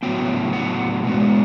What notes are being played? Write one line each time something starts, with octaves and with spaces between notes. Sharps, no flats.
A2 F#3 B3 G5
F#5
B2 G#3 B3